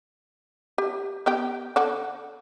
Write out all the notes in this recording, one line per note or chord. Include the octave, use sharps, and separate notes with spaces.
G4
B3 G4 G5
D3 D5 F#5